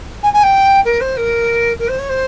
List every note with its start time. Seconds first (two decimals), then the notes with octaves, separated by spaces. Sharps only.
0.23 G#5
0.33 G#5
0.43 G5
0.85 A#4
1.00 C5
1.16 A#4
1.79 A#4
1.88 C5
1.98 C#5
2.09 C5